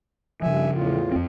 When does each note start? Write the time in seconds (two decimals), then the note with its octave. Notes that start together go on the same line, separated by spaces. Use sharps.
0.42 G2 C#3 F3 E5 G#5
0.74 E2 A2 F4
1.12 F2 C4